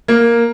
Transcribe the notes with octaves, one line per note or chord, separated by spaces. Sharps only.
A#3